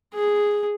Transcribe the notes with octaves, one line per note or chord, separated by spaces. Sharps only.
G#4